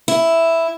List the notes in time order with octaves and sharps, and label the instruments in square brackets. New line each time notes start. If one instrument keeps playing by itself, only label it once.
[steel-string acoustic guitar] E4